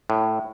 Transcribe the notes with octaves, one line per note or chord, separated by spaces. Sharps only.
A2